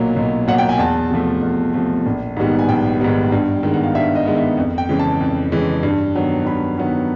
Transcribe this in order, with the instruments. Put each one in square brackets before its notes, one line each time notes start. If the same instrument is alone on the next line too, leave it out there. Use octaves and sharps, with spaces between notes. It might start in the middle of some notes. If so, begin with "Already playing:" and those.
Already playing: [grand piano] B1 A#2 F#3 A#3
B1
A#2 F#3 A#3 F#5
G5
G#5
E2 A5
C3 F3 A3
E2
C3 F3 A3
A#1
G#2 D#3 G3 B3
G#5
A#1 G5
G#2 D#3 G3 B3
G2
D#3 G#3 B3
F#5
F5
G2 E5
D#5
D#3 G#3 B3
E5
F2
G5
C#3 E3 G#3
A5
F2
C#3 E3 G#3
G2
D#3 F#3 B3
G2 B5
D#3 F#3 B3